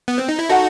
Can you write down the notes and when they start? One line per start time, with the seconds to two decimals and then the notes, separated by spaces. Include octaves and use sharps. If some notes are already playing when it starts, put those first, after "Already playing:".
0.08 B3
0.18 C4
0.29 D#4
0.39 E4
0.49 D#4 F#4 A4 D#5 F#5